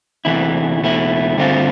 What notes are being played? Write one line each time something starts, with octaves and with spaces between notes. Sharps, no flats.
E2 C3 E3 A3 E4
E2 B2 A3 E4
G2 D3 A3 C4 F4